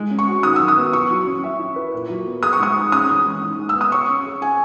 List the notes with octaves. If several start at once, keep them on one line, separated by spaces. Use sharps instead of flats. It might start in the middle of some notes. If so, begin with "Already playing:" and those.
Already playing: G#3
C#4
C#6
F#4
D#3 D#6
F#3 E6
D#6
B3
E4 C#6
F#3
C#4
E5
E4
B4
A#2
F#3
B3
G#4 D#6
C#6
G#3 D#6
D#4
C#4 D#6
E3
G#3
D#4
G#3
E6
B3
D#6
C#5 C#6
C#4
G#4
G#4 G#5